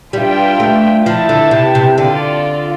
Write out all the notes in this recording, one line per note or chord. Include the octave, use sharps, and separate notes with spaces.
G3 D4 F4 B4 E5 G5
A3
F3 E4 B4 E5 A5
D3
C3
C3
D3 F4 A4 D5